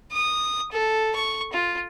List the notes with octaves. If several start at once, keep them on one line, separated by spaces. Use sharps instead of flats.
D#6
A4
C#6
F4